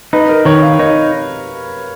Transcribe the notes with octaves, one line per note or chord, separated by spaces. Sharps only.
D#4 B4
A#4
D#3 C#5
F5
D#4 C#5